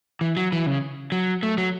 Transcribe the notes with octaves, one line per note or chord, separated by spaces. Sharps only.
E3
F#3
E3
C#3
F#3
A3
F#3